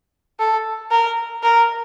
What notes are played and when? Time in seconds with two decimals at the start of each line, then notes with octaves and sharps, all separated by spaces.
0.39 A4
0.91 A#4
1.43 A#4